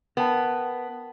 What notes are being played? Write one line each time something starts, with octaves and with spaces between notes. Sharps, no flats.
B3 A#4 G5 A5